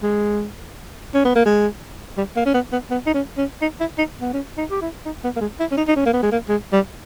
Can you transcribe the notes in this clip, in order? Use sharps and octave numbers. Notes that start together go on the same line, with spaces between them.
G#3
C#4
B3
A#3
G#3
G3
A#3
C#4
B3
B3
B3
D#4
C#4
C#4
D#4
E4
D#4
B3
C#4
D#4
G4
E4
D#4
B3
A#3
G#3
E4
C#4
D#4
D#4
C#4
A#3
B3
G#3
A#3
G#3
G3